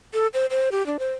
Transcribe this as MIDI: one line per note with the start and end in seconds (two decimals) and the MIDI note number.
0.14 0.27 69
0.34 0.46 72
0.50 0.69 72
0.72 0.85 67
0.86 0.97 62
0.99 1.13 72